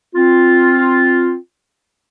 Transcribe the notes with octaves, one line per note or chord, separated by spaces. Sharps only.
C4 F4